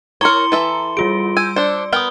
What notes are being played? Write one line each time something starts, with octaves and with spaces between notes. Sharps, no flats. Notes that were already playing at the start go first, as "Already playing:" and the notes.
E4 A#4 C#5 A#5 C6 C#7 G7
E3 A4 E5
G3 F4 G#4 D7
G#5 E6 G6
D4 C5 D5
B3 A#4 G5 D#6 G7